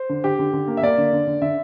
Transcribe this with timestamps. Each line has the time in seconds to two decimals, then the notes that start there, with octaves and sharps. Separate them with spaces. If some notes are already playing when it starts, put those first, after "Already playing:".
Already playing: C5
0.09 D3
0.24 D3 G4
0.39 D3
0.53 D3
0.68 A#3
0.77 E5
0.83 A#3 D5
0.98 D3
1.13 D3
1.27 D3
1.42 D3 E5